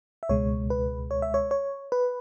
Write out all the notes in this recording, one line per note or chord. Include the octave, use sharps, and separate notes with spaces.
E5
C#2 B2 G#3 C#5
B4
C#5
E5
C#5
C#5
B4